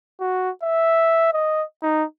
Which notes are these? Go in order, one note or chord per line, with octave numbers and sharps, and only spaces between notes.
F#4
E5
D#5
D#4